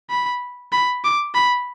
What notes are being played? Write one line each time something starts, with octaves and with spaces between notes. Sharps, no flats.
B5
B5
D6
B5